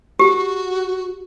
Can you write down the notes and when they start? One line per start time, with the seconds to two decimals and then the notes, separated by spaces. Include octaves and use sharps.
0.19 F#4 G4